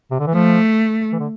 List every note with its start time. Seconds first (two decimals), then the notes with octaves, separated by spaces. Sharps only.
0.11 C3
0.19 D3
0.27 E3
0.34 F3 A3
1.12 E3
1.20 D3